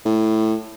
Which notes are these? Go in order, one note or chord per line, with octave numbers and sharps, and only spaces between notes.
A2